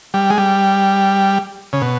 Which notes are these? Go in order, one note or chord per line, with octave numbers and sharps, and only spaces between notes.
G3
G#3
G3
C#3
B2